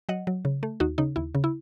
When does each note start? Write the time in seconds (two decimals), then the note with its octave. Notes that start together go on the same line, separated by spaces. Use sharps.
0.09 F#3 D#5 F#5
0.27 F#3
0.45 C#3
0.63 A3
0.80 D#2 D#4 F#4
0.98 C#3 D#4
1.16 D#2 E4
1.35 C#3
1.44 E4